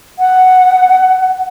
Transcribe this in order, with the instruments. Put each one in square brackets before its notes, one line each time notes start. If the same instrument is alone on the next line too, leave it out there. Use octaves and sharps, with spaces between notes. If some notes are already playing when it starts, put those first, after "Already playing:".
[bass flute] F#5